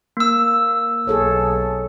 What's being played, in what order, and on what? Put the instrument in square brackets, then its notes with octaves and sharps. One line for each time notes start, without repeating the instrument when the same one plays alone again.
[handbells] A#3 E6
[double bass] B1 [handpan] G#4 A4 C#5